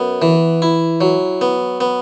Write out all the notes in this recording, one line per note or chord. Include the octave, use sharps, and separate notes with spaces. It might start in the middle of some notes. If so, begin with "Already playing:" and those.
Already playing: F#2 B3
E3
E4
F#3
B3
B3